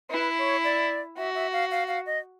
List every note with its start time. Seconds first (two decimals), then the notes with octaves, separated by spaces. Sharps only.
0.11 E4 B4
0.38 C#5
0.64 D5
1.18 F#4 E5
1.35 E5
1.53 F5
1.71 F5
1.88 F5
2.06 D#5